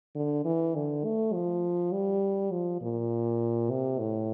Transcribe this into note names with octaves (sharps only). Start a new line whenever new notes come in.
D3
E3
D3
A3
F3
G3
F3
A#2
C3
A2